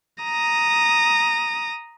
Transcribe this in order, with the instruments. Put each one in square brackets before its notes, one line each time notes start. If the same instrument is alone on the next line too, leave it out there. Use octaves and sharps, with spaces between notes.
[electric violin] A#5 D#6